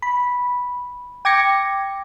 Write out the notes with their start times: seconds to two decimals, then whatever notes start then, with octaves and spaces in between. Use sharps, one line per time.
0.02 B5
1.25 G5 D6 G#6 A#6 C#7